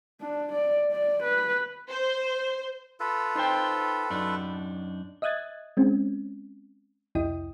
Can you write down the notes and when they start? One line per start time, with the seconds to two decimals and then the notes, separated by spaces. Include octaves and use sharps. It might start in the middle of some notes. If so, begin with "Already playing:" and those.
0.21 D4
0.53 D5
0.92 D5
1.23 B4
1.90 C5
3.00 F4 A4 B4
3.35 D#4 C5 G5
4.10 F#2 D4 D#4
5.22 D#5 E5 D#6 F#6 G#6 A6
5.77 G#3 C4 C#4
7.15 C2 F2 E4 D#5 G5 D#6